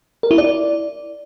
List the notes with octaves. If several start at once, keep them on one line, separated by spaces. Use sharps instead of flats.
A#4
E4
D5